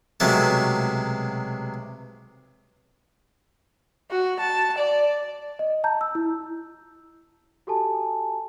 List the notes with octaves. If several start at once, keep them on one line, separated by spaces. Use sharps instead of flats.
B1 C3 F#3 G#3 A3 A5
F#4
A5
D5
D#5
A5 A#5 G6
E6
E4
F#4 G4 A4 G#5 A5